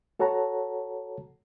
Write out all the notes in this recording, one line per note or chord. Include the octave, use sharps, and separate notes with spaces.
F#4 A4 C#5 F#5 A5 A#5